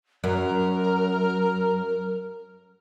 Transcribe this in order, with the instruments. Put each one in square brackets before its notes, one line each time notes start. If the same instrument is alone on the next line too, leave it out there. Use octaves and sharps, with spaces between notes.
[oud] F#2 [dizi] A#4